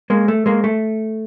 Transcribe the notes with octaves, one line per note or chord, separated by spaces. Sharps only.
G#3 A#3
A3
G#3 A#3
A3